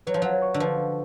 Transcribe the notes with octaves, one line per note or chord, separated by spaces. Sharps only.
F#3 B4
F3
F#3 F#5
C#6
D3
F3 B4
B4